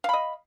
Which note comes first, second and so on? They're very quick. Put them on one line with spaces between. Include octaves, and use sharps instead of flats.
F5 B5 D#5